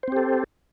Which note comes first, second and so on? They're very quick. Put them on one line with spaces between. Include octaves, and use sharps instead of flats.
C5 C4 G4 A4